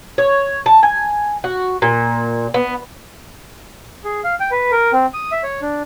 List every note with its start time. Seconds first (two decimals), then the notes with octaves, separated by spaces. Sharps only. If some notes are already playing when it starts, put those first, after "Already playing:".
0.18 C#5
0.66 A5
0.83 G#5
1.44 F#4
1.82 A#2
2.54 B3
4.04 G#4
4.24 F5
4.40 G5
4.51 B4
4.72 A#4
4.93 C4
5.14 D#6
5.32 E5
5.43 C#5
5.62 D4